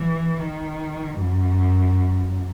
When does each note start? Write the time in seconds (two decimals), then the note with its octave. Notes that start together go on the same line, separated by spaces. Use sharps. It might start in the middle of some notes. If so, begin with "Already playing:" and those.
Already playing: E3
0.39 D#3
1.21 F#2